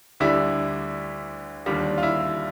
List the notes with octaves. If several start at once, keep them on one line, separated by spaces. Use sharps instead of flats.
D2 D3 G3 E4
D#2 D3 G3 F4
F4
E4